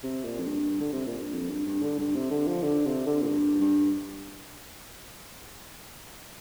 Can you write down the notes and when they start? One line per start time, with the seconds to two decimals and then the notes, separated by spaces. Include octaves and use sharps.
0.03 C3
0.24 A#2
0.39 F2
0.47 G2
0.79 D3
0.92 C3
1.06 A#2
1.20 G2
1.33 F2
1.50 G2
1.66 G2
1.82 D3
1.99 G2
2.15 C3
2.30 D3
2.47 F3
2.63 D3
2.85 C3
3.06 D3
3.22 A#2
3.28 G2
3.60 G2